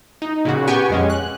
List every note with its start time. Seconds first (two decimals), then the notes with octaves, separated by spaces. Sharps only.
0.22 D#4
0.45 A#2 C#3 F#4
0.67 B3 G4 G5 G#5 C#6
0.90 F2 G#3 C#4
1.10 F#6